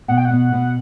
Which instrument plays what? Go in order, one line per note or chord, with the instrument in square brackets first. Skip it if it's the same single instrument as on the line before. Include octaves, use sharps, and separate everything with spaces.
[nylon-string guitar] B2 [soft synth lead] F#5
[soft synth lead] G5
F#5
[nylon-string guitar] B2
B2